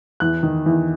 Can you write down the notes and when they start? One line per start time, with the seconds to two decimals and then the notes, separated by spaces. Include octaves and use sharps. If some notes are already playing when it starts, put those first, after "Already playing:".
0.20 E2 F#6
0.43 D#3
0.66 E2